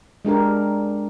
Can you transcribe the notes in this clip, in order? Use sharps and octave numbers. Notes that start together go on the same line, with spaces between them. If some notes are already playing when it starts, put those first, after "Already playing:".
G#3 D4 G4 A#4